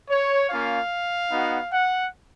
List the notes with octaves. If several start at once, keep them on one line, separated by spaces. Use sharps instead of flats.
C#5
A#3 C#4 F4 F5
B3 D#4 F#4
F#5